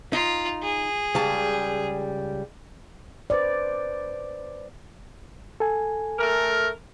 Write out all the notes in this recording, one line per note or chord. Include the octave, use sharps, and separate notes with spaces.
D#4 F4
G#4
C#2 G3 A5
B4 C5 D5
A4 G#5
A3 A#4